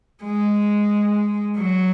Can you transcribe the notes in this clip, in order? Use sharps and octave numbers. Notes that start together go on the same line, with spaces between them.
G#3
F#3